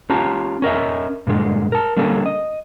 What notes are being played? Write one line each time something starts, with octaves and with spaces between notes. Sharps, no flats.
C#4 F4 G4 A5 A#5
C#4 A#4 D#5 E5
G2 A#2 D3 G#3
A#4 A5
D3 G3 A#3 C#4 A4
D#5